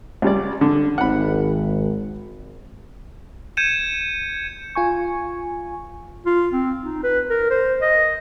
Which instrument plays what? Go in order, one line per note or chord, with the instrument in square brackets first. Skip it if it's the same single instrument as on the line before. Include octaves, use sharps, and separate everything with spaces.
[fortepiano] C#2 G3 D5
D3
[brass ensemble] G#1 [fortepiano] F#5 B5
[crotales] G6 G#6 C#7 D#7 E7
[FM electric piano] F4 G#5 C#6
[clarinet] F4
C4
D#4
B4
A#4
C5
D#5